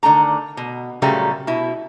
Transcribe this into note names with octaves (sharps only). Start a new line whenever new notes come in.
D3 D#3 A3 A#5
B2
A#2 C#3 F#3 G3 A3 A#3
B2 E4